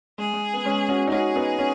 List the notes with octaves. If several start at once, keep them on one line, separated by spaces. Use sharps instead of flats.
G#3 G#4
G#3
B3
G#3 C#4
C#4 F#4
D#4
C#4 F#4 G#4
B3 D#4
C#4